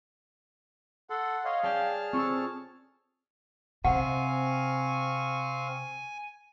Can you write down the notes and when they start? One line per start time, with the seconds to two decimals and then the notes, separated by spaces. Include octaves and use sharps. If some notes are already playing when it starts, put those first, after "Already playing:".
1.10 A4 F#5 C6
1.45 C#5 D#5 F5 C6
1.63 C#4 G#4 D5 G5 A5 F6
2.13 C4 F4 A4 C#6 E6
3.85 C3 C4 F5 F#5 G#5 C#6